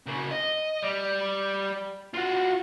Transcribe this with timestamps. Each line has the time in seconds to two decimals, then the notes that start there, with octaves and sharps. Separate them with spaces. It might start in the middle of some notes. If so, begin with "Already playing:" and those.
0.06 C#3 A#3
0.31 D#5
0.82 G3
2.14 F4 F#4